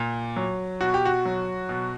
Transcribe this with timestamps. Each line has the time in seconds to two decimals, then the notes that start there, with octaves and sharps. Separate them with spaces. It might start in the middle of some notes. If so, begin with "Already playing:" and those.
Already playing: A#2
0.36 F#3
0.81 B2 F#4
0.94 G4
1.05 F#4
1.26 F#3
1.69 B2